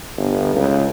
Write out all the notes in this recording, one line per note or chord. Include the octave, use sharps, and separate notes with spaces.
G1
C#2